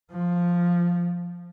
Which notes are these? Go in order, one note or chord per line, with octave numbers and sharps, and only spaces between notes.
F3